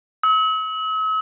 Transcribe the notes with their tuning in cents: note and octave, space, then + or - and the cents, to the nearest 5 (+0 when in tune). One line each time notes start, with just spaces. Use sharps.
E6 -45